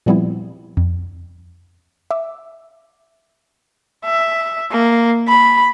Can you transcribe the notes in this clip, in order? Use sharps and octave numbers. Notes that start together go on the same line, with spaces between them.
A#2 F3 G3 B3 C4 E4
F2
E5 D6 E6
E5
A#3
B5